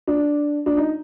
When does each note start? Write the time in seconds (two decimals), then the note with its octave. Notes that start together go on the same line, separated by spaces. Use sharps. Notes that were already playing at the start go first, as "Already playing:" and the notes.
0.07 D4
0.66 D4
0.77 D#4